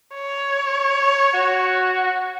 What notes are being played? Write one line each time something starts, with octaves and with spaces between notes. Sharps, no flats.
C#5
F#4